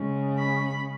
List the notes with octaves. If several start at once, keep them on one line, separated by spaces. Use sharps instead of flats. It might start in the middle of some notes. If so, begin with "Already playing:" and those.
Already playing: C#3 G#3 C#4
B5